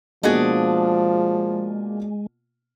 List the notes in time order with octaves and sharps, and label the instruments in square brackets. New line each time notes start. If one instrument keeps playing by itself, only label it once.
[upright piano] B2 A#3 F4 [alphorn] F3 [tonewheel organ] G#3 [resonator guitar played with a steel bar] D4 F#4 G#4